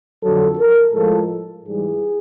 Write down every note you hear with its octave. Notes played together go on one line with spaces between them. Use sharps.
F2 D3 F#3 A4
A#4
A2 F3 G#3 A4
G#2 E3 G3 G#4